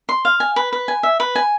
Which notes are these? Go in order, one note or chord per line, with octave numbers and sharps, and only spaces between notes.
C6
F5
G#5
B4
B4
G#5
E5
B4
G#5